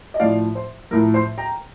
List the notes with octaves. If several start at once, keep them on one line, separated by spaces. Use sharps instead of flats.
D#5
A2 F3 D5 F5
C5
A2 F3 A#4
C5
G5 A#5